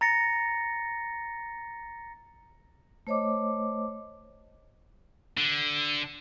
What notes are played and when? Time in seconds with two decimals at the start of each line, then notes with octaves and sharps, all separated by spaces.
0.01 A#5 A6 A#6 C#7
3.07 A3 C5 C#5 D#5 D6
5.37 D3